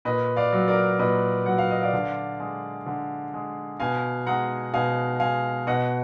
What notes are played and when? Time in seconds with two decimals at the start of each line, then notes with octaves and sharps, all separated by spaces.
0.05 A#2 B4 D#5
0.36 D5 F5
0.52 F#3
0.68 A#4 D5
0.99 A#2 B4 D#5
1.46 F#3 F#5
1.58 F5
1.71 D#5
1.83 D5 F5
1.93 D3
2.40 G#3
2.86 D3
3.34 G#3
3.80 B2 F5 G#5
4.26 G#3 F#5 A#5
4.73 B2 F5 G#5
5.20 G#3 F5 G#5
5.67 B2 D#5 F#5